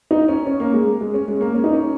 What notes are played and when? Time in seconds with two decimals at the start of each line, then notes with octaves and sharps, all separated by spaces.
0.11 D#4
0.28 C#4
0.47 C#4
0.60 A#3
0.74 G#3
1.01 G#3
1.14 C#4
1.28 G#3
1.41 A#3
1.54 C#4
1.64 D#4
1.74 C#4